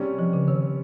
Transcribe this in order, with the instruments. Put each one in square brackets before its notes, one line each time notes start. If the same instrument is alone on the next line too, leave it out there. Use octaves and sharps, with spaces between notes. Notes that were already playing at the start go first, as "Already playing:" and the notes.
Already playing: [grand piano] C3 G3 C#4
[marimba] F3
C#3
D#3